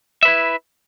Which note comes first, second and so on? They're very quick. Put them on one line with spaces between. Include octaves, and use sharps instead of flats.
E5 B4 E4